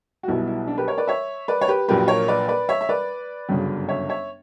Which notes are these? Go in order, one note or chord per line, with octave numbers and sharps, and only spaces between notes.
F#4
B1 B2 G3 B3 E4
E4
D4
G4 B4
A#4 C#5
B4 D5
C#5 E5
B4 D5
C#5
G4 B4
A#1 A#2 F#3 A#3 G4 B4
A#4 C#5
B4 D5
B4 D5
C#5 E5
E5
B4 D5
G1 F#2 C#3 F#3
C#5 E5
C#5 E5